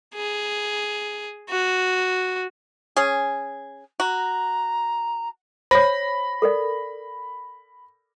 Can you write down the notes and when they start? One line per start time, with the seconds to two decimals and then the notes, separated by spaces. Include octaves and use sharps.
0.14 G#4
1.50 F#4
2.97 C#4 G#4
4.00 F#4 A#5
5.71 C5 C#5 B5 A#6
6.42 A4 A#4 D5